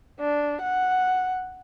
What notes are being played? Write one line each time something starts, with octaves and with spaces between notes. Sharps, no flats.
D4
F#5